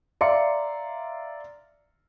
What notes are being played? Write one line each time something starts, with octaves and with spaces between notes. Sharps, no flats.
D5 E5 F5 A#5 C6 C#7